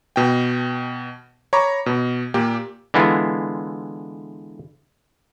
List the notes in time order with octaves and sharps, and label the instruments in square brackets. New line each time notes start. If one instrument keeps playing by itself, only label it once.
[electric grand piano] B2 G5
C#5 A#5 B5 C#6 D6
B2
A#2 A#3 G4
[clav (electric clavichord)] D3 E3 G#3 B3 E4 F4